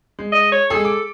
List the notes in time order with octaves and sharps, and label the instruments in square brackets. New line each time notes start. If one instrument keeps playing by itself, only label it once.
[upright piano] G#3
[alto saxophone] D#5
C#5
[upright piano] G#3 G#4 [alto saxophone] A4
[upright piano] D6